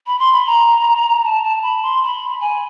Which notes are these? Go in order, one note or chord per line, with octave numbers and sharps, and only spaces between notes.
B5
C6
B5
A#5
A5
A5
B5
C6
B5
G#5